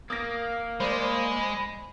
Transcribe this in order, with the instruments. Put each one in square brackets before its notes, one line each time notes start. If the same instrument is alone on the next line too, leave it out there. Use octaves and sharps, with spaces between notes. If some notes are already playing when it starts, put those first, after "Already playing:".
[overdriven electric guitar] A#3 [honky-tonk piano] D#6 A#6
[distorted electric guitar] G#3 [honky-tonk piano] C5 D5 [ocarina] B5